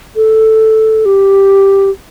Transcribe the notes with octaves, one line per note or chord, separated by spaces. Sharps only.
A4
G4